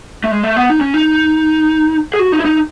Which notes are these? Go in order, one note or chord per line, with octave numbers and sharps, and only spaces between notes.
A3
G#3
A3
B3
D#4
C#4
D#4
G#4
F#4
D#4
E4
D#4